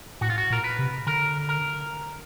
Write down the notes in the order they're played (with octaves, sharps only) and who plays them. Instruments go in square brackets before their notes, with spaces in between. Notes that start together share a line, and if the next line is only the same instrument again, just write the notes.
[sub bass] A2 [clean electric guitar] F#4
[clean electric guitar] F4
F#4
[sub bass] A#2 [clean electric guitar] A#4
[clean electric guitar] B4
[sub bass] C3
[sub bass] D3 [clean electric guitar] A#4
[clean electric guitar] A#4